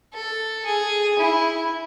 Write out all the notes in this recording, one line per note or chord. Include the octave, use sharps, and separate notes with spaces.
A4
G#4
E4